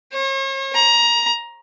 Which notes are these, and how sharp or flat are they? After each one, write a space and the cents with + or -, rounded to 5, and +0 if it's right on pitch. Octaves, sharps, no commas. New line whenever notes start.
C#5 -45
A#5 +20